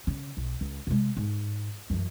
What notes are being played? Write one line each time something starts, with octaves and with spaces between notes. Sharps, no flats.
C#3
B1
C#2
C3 G#3
G#2
F#2 E3